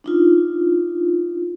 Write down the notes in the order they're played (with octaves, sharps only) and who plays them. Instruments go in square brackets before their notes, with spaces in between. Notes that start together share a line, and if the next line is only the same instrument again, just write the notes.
[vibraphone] D4 D#4 F4